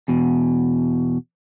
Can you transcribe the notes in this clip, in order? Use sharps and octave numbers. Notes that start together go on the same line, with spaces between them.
E2 B2